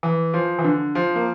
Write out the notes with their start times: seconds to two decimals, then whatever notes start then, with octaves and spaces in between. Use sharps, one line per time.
0.03 E3
0.34 F3
0.59 E3
0.64 D3
0.95 F3
1.16 A#3